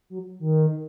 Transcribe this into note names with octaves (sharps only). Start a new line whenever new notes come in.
F#3
D#3